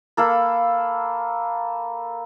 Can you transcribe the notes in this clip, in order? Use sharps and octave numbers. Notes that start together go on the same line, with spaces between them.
A#3 A4 F5 B5